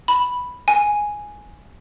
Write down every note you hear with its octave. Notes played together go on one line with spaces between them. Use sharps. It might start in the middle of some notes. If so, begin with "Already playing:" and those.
B5
G#5